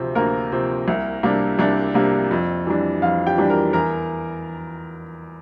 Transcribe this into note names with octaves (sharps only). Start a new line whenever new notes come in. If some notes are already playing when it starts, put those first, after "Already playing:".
Already playing: D2 C3 F3 C4
D2 A#3 A#4
C3 F3 C4
C2
C3 G3 A#3 D4
C2 D4 D5
C3 G3 A#3 D4
F2
E3 G3 D4
F2 F4 F5
G4 G5
E3 G3 D4
A#4 A#5
E2 A#4 A#5